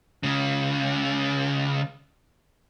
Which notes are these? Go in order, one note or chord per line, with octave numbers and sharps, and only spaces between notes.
C#2 C#3